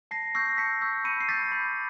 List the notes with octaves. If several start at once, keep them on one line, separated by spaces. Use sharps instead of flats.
A5 A#6 C7
C#6 E6 G6 A#6 C7
A5 B6 C#7
C#6 E6 G6
B5 C#7 D#7
C7
D6 G6 A6 B6
B5